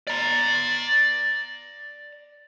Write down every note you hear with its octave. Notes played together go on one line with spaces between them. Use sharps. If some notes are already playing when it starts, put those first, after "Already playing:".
D5 A#5